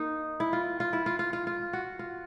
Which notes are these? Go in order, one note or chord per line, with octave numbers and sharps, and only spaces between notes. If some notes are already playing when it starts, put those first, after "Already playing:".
Already playing: A#3 D#4
E4
F4
F4
E4
F4
F4
F4
F4
F#4
F4